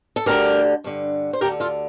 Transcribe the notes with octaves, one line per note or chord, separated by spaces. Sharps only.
A4
D2 D3 G4 A#4
G2 D3
C5
D2 D3 G4 A#4
F4 A4